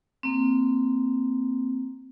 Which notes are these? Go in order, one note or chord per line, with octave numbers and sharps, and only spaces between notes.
A#3 C4